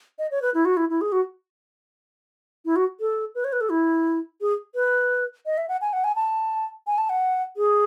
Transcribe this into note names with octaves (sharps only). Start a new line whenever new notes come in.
D#5
C#5
B4
E4
F#4
E4
E4
G#4
F#4
E4
F#4
A4
B4
C#5
B4
A4
E4
G#4
B4
D#5
E5
F#5
G#5
F#5
G#5
A5
G#5
A5
F#5
G#4